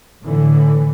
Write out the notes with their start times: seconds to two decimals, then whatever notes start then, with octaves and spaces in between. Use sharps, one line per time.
0.22 A2 D3 E3